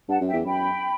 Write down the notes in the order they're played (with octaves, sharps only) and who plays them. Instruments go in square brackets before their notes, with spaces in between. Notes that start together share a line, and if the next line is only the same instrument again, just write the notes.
[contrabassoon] G2 [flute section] F#5 A5
[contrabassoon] F#2
[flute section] E5 G5
[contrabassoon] E2
[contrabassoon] F#2 [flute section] G5 B5